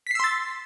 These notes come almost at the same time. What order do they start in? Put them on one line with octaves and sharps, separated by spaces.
B6 C7 E6 C6 A6